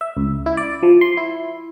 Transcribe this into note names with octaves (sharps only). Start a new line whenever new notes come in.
E5
C#2
E4
D5
F3
C6
E4